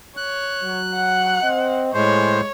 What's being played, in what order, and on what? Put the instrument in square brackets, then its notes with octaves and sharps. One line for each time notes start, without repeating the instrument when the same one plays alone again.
[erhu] C#5 [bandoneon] F#6
[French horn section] F#3
[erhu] F#5
[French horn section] C4 D#5
[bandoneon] A2 C5 [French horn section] G#3 [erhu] C#5